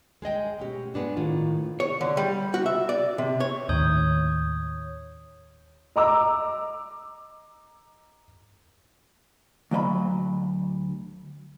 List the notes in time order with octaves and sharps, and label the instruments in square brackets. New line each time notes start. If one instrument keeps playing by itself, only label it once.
[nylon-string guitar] G#3 G#4 D#5 G5
B2 A3 C#4 G4
G#3 B3 D4 F#4
A2 D#3 F4
[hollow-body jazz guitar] C#5
D3
G3
F#4
E5
D5
C3
C#5
[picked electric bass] D#2 A2 D#3 [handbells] C#5 D#6 G6
[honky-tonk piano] D#5 A#5 D6 E6
[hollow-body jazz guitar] D2 F#3 D#5 B5